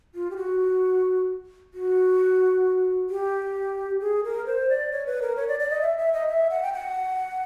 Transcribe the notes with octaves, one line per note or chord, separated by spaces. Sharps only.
F4
G4
F#4
F#4
G4
G#4
A#4
C5
D5
C#5
B4
A#4
C#5
D5
D5
D#5
E5
E5
D#5
E5
F#5
G5
F#5